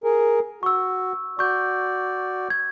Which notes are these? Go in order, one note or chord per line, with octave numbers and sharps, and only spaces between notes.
G#4 A#4
F#4 C#6 E6
F#4 D5 C#6 G6
G#6